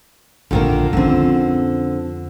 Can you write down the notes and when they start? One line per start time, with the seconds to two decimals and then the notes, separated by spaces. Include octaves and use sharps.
0.51 A#1 F2 D3 D#3 A#3
0.93 F2 D3 C4 C#4